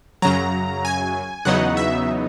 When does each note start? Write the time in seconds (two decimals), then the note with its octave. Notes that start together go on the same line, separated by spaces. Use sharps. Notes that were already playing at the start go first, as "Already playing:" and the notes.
0.22 F#2 C#3 F#3 A#5
0.85 G#5
1.45 E2 C#3 F#3 B3 D#4 F#5
1.77 E5